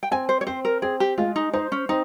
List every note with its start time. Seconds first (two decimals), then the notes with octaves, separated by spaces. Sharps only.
0.03 G5
0.11 C4 G#5
0.29 C5
0.41 C#5
0.47 C4 C5
0.65 A#4
0.82 C4 G#4
1.00 G4
1.18 G#3 F4
1.36 D#4
1.53 D#4 C5
1.72 C#4
1.89 C4 D#4